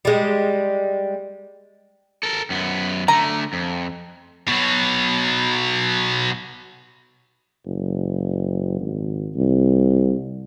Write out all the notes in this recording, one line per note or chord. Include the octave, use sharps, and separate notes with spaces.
G3 G#3
A4 A#4
F#2 B3
D3 A3 A#5
F2
B2 F#3
F#1
G#1
C2